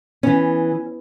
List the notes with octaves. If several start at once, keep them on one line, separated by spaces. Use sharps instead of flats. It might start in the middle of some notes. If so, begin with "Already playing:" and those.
E3 B3 C#4